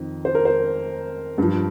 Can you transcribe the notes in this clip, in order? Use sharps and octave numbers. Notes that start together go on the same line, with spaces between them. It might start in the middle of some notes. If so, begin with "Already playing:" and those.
Already playing: F2 D#3
C5
A#4
C5
G2 F3